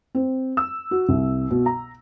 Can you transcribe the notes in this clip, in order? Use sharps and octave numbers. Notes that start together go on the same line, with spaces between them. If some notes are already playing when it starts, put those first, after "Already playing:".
C4
E6
F#4
C2
B2
A#5